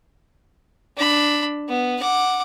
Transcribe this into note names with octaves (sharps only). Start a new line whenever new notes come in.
D4 B5
B3
F#5 D6